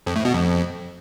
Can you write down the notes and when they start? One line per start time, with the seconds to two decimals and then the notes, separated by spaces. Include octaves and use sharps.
0.06 F2
0.16 A2
0.25 B2
0.34 F2